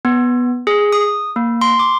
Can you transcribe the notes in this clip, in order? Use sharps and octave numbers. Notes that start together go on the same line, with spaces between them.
B3
G#4
D#6
A#3
C6
D6